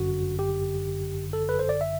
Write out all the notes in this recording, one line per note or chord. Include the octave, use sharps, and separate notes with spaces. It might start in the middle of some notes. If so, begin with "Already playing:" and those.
Already playing: G1 F#2 D3 F#4
G4
A4
B4
C5
D5
E5